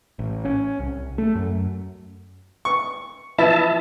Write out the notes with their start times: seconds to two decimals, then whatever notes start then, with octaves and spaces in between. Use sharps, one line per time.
0.19 A1
0.45 C#4
0.79 C2
1.18 A3
1.35 F#2
2.65 C#6
3.38 E3 F3 E4 E5 A5